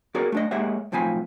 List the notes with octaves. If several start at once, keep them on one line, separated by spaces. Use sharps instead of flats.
B3 F#4 G#4 A#4 C#5 D5
A3 D4 D#5
G#3 A#3 G4 C#5 E5 F#5
B1 A2 F3 C4 G#5 B5